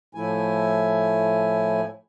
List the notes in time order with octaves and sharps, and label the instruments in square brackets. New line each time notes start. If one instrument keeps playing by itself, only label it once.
[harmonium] A2 F3 A3 E4 G#5